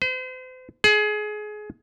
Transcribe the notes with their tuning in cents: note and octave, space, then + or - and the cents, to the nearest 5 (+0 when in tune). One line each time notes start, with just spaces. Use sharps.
C5 -40
G#4 +25